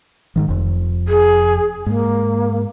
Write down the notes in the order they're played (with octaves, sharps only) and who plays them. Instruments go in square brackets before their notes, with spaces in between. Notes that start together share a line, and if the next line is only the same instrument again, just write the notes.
[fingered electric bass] G#2 D#3 F3
F1 F2
[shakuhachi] G#4
[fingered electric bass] G#2 [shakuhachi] A#3